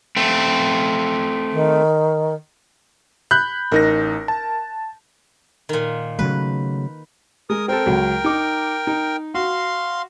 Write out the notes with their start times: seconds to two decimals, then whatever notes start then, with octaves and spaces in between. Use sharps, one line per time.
0.17 A3 C4
1.52 D#3
3.31 B5 F#6 G6
3.72 A1 D#4 A#4 A#6
4.28 A5
5.69 A#2 D#3
6.19 C#3 F#3 A3 B4
7.50 G#3 A#4 D#6
7.68 C4 A4 A#4 G5
7.86 C#2 F#3
8.24 D#4 D6
8.87 D#4
9.35 F#4 F5 C6